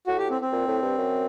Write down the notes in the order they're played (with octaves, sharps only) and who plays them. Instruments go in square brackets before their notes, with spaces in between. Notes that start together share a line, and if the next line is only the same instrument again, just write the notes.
[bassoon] A2 [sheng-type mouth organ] F#4
[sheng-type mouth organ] G4
C4
C4
[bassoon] A#2
A2
G2
F#2